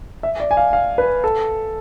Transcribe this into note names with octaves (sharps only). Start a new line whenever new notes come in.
E5
D5
G#5
F5
F5
B4
A4